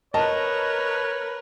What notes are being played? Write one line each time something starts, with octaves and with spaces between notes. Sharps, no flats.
A#4 B4 C#5 D#5 A5